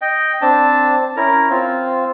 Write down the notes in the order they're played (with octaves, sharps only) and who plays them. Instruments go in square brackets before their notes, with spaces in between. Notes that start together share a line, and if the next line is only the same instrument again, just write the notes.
[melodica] D#5 G5
C4 D4 A5
C#4 E4 A#4 A#5
C4 F4